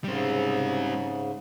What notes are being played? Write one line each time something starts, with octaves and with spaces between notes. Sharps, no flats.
G#2 C#3 G3 C4